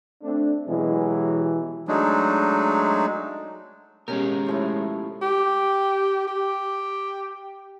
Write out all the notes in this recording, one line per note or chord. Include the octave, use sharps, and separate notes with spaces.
A3 C4 D4
B2 E3 F#3 G#3 G4
F#3 G#3 A3 D4 D#4
B2 G#3 C#4 G4 A#4
A2 F3 E4
G4
G4